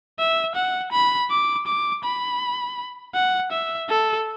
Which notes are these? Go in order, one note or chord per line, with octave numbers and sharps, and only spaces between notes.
E5
F#5
B5
D6
D6
B5
F#5
E5
A4